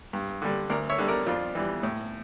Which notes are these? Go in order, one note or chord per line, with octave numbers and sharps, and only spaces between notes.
G2
D3 G3
D2 A#4 D5
C#5 E5
D3 G3
A#4 D5
F2 D4 F4
E3 G3
A2